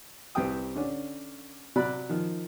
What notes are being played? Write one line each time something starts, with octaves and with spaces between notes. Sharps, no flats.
C2 C4 G4 B4 G5 D#6
D3 C#4 D4
C3 F#3 D5 B5 F#6
D#3 F3